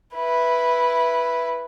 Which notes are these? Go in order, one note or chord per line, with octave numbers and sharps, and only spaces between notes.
E4 B4